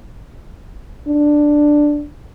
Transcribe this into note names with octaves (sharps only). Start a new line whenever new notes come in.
D4